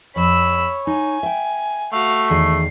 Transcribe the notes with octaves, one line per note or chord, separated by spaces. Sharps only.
F2 C#5 B5 E6
D#4 G#5
E5 G5
A3 F#4 F5
E2 D#3 G#4 C7